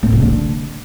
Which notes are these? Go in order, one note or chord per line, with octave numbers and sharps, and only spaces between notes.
A2
C#3
D3